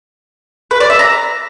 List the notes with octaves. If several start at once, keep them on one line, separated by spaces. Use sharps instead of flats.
B4
D5
E5
A#5